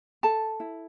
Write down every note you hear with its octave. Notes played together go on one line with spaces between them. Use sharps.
A4 A5
E4